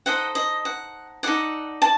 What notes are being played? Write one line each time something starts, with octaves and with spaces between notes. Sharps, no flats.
D#4 A4 C5 D#5 F#5
D#5
F#5
D#4 A4 D5 F#5
A5